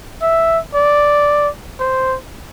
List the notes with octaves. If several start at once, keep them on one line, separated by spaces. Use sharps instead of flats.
E5
D5
C5